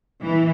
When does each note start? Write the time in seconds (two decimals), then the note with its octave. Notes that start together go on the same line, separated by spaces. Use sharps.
0.22 E3